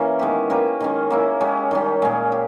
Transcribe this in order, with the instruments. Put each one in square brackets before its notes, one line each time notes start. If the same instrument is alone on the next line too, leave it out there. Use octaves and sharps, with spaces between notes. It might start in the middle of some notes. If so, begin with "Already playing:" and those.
Already playing: [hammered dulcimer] E3 A#3 C#4
D#3 G#3 B3 G4
A#3 C#4 G4 B4
D#3 G#3 C#4
A#3 C#4 E4
G#3 C#4 G4
D#3 G3 C#4 G4
A#2 G#3 C#4 G#4
G4